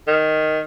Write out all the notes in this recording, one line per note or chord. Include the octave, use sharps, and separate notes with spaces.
D#3